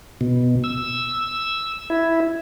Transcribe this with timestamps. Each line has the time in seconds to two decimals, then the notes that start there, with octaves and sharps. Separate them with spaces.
0.21 B2
0.64 E6
1.90 E4